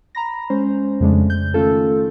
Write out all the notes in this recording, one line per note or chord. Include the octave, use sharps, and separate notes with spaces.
A#5 B5 A#6
G#3 C#4 C5
F2 C#3 G#3 A3 D4
G6
D#3 A3 C#4 F4 A4